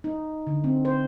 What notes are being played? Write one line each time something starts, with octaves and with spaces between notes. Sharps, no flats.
D#4
D3
C4
C5